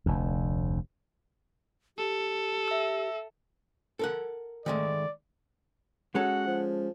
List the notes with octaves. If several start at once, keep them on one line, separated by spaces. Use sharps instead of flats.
F1 D2
G4 A4
E5 E6
A4 A#4 F#5
D#3 G#3 A3 D5
G#3 C#4 F#4 A4 F#5
F3